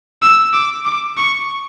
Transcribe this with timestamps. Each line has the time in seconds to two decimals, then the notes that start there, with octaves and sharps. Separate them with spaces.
0.22 E6
0.53 D6
0.85 D6
1.17 C#6